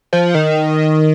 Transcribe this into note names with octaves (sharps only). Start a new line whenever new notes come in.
F3
D#3